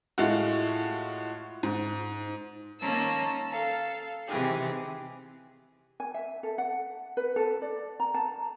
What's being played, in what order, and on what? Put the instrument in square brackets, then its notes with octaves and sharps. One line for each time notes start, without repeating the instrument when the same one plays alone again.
[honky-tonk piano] A2 G#3 A3 F4 F#4
G#2
[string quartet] D#3 A#3 C#4 A5 A#5 E6
A4 F5
C3 D#3 E3 G4 G#4
[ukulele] G#5
E5
A4
F#5
B4
A4
D5
A#5
A5